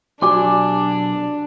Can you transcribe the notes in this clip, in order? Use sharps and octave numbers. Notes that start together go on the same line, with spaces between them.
B1 D4 F#4 G4 D5 G#5 D6